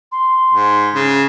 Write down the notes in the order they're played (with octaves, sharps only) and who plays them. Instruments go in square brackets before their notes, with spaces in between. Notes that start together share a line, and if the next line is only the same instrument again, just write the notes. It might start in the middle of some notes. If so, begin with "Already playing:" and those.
[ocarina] C6
[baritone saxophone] G#2
C#3